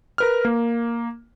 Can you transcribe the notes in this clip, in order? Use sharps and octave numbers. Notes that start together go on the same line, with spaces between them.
A#4 B4 F6
A#3